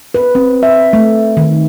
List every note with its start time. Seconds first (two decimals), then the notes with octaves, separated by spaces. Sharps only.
0.14 B4
0.35 C4
0.63 E5
0.93 A3
1.37 D#3